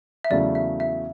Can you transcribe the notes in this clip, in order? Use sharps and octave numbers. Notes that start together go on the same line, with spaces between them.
E5
E2 C#3 F#3 A3 E4 D5
E5
E5